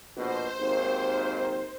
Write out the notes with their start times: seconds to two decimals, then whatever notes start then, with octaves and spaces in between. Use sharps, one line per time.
0.15 A#1 B2 C5
0.59 G#1 D#2 D#3